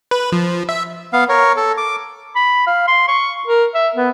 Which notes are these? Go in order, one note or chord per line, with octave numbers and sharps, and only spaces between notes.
B4
F3
E5
B3 F5
A#4 C#5
A4
D6
B5
F5
C6
C#6
A#4
E5
B3